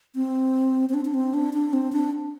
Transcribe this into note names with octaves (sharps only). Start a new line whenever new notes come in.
C4
C4
D4
D4
C4
D4
D4
C4
D4